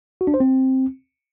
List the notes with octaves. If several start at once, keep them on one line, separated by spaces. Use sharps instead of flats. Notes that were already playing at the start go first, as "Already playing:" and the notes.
F#4
D4
C5
C4